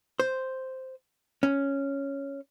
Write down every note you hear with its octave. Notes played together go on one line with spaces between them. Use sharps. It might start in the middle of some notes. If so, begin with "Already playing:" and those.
C5
C#4